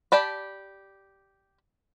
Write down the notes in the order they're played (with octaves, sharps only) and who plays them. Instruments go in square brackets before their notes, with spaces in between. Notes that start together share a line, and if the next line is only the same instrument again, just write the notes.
[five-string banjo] G4 D5 A5 B5